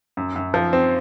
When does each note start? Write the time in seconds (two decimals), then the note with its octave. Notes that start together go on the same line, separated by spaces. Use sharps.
0.17 F#2
0.36 F#2
0.54 F3
0.73 C4